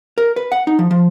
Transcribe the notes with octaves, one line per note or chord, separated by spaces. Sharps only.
A#4
B4
F#5
D#4
F3
F3